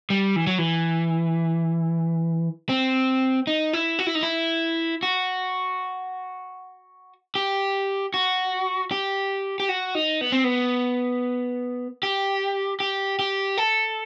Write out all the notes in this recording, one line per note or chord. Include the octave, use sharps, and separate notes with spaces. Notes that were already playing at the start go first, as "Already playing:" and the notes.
G3
E3
F#3
E3
C4
D#4
E4
F#4
E4
D#4
E4
F#4
G4
F#4
G4
G4
F#4
D#4
B3
C4
B3
G4
G4
G4
A4